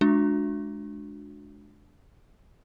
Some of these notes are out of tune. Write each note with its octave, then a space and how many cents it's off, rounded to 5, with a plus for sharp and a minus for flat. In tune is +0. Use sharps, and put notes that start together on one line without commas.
G#3 +25 D4 +0 F#4 -35